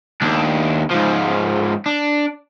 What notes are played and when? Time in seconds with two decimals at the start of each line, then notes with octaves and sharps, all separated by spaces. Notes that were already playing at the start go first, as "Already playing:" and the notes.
0.22 D#2 D4
0.91 G#2 F3
1.86 D4